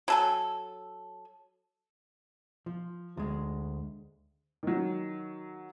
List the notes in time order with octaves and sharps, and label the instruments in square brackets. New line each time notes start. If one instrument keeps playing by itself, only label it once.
[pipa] F#3 A4 G#5
[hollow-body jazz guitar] F3
D2 G#3
[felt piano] D#3 F#3